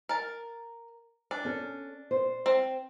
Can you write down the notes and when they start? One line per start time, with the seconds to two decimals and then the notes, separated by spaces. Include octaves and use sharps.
0.09 A#4 A5
1.31 D4
1.45 C#4 A4
2.11 C5
2.46 C4